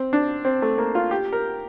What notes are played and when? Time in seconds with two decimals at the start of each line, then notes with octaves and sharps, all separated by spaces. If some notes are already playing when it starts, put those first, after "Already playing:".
Already playing: C4
0.13 D4
0.45 C4
0.62 A3
0.78 A#3
0.95 F4
1.11 G4
1.33 A#4